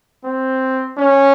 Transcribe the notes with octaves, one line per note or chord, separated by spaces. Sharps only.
C4
C#4